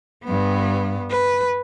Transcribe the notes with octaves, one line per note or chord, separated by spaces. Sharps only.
G2 B3
B4